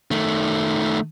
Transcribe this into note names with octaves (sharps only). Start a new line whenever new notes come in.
D#3 A3